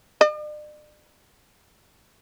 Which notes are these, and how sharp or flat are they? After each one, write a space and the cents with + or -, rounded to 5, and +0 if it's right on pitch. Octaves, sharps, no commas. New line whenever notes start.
D5 +45